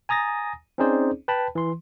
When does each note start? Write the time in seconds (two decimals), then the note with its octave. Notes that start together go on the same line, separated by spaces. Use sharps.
0.09 G#5 A#5 D#6 A6 A#6
0.78 C4 C#4 D#4 G#4 C5 D5
1.28 B4 G5 A5 B5
1.55 E3 C6